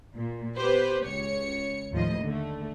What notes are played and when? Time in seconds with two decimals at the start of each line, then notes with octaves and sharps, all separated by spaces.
0.16 A#2
0.57 B3 G4 B4 C5
1.04 C#2 C#5 C#7
1.91 D#2 A2 F3 D#5
2.22 D3 A3